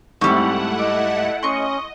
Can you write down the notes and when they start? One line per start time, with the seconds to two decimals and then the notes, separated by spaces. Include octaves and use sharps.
0.21 G#2 G3 A3 C4 E4 F#5 C#6 E6
0.79 D#5 D6
1.43 C#4 D#5 C6 C#6